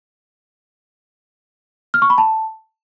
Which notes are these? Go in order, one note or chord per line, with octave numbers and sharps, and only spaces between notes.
F6
C#6
B5
A5